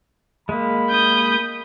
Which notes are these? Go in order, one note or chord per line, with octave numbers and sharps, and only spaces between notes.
G#3 A#3 B5
D#6 G6